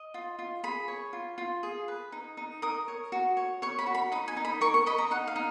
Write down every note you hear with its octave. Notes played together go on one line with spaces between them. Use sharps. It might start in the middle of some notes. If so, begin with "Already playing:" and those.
Already playing: D#5
F4
F4
G#4 B5
C#5
F4
F4
G#4
B4
D#4
D#4
A#4 D#6
C#5
F#4
C#5
C#5 C#6
B5
F#4
B5
D#4 B5
G#5
D#4
B5
A#4 C#6
C#6
D#5 B5
A#5
D#4 F#5
F5
D#4